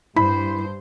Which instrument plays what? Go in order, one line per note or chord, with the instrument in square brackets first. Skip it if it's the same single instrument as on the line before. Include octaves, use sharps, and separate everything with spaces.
[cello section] G2 C5 [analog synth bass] E4 [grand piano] B5